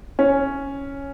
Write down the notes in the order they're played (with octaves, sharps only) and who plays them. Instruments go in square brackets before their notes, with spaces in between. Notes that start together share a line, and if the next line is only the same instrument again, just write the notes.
[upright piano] C#4